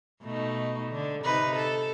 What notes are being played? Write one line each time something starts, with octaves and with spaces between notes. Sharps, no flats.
B2 A3 D#4
D3
C3 D#4 B4
A4